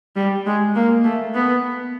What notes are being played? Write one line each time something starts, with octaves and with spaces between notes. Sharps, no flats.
G3
G#3
A#3
A3
B3